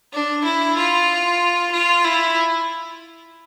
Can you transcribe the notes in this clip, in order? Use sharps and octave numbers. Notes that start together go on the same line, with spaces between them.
D4
E4
F4
F4
E4